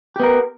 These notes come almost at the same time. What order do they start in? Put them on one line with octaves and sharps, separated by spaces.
G4 B3 A#4